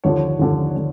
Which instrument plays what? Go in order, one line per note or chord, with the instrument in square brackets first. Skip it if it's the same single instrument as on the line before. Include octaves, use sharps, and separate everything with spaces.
[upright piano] D#2 D3 F3 C#5
D#2 D3 F3
D3